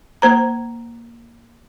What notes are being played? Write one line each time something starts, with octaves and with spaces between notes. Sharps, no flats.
A#3 C5 A#5